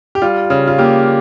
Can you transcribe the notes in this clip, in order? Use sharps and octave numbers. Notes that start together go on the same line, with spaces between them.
G4
G3 F4
C#3
F4
A#3 G4